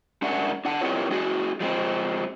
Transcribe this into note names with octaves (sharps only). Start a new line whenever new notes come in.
G#3 C#4 D4 A#4 E5 F#5
D4 F#5 A5
C4 E4 F4 G4 A#4 C#5
G#3 C#4 F#4 G#4
F3 G#3 C4